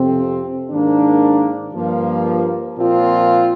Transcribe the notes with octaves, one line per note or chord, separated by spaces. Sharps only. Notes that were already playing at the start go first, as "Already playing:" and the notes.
Already playing: F2 C3 F3 C4
G#2 D#3 A#3 D4
G2 F3 A#3
A#2 F3 C4 F4